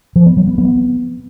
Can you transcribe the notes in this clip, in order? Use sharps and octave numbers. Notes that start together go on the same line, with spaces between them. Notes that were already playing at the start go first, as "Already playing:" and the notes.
F3
B3
F#3
B3
B3